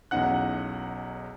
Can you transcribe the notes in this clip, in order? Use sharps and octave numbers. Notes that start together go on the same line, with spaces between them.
B1 E2 C#4 D#4 F#5 F#6